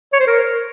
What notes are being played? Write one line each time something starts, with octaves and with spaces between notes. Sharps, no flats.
C#5
C5
A#4